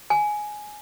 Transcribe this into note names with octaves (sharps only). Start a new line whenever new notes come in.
G#5